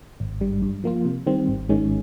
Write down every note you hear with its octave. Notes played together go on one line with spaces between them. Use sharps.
G#1
G2 G3
G2
F3 A#3 F4
C3
D#3 G3 C4
G#1
G#2 D#3 G#3 C#4